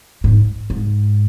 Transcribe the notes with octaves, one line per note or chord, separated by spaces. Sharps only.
G#2
G#2